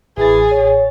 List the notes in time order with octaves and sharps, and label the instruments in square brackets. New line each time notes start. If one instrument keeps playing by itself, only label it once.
[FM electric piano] A1 G#5 A6 [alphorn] E3 [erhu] G#4
[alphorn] C#5